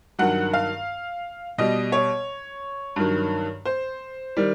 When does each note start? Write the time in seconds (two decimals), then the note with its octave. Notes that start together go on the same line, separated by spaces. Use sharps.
0.19 G2 D#3 F#3 F#5
0.53 F5
1.58 B2 G3 D#5
1.92 C#5
2.96 G2 D#3 F#3
3.65 C5
4.37 D#3 G3